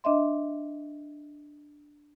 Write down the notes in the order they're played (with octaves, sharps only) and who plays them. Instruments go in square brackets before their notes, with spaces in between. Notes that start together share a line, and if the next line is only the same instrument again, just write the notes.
[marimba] D4 D#5 E5 C6